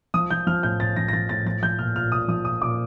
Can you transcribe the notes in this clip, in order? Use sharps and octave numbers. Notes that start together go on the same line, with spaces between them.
F3 D#6
F3 G6
F3 F6
A2 G6
A2 A6
F3 A#6
A#6
F3 A6
A2 A6
F3 A6
F3 G6
A#2 F6
A#2 F6
A#2 D#6
F3 D#6
A#2 D#6
A#2 D6